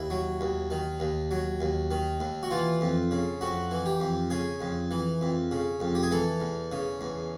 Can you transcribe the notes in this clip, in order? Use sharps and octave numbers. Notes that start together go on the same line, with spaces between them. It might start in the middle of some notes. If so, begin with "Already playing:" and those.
Already playing: D#2 E4
F#3
D#2
D#3
D#2
F#3
D#2
D#3
D#2
F#4
E3 F4
F2
C#3
F2 F#4
E3
G4
F2
C#3 G#4
F2
E3
F2
C#3
F2
G4
G#4
E3 A4
E2
C#3
E2